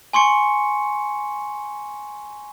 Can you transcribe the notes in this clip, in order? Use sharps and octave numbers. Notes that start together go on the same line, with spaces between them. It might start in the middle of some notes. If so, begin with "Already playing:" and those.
G#5 C6 C#6 C#7